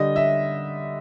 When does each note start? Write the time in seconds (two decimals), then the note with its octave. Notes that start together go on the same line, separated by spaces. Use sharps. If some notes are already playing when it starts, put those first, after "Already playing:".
Already playing: D3 G3 D#5
0.16 E5